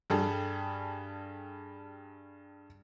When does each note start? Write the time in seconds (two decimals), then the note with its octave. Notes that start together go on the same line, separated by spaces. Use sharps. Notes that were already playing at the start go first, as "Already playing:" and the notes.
0.10 G2 G3 G#4 A4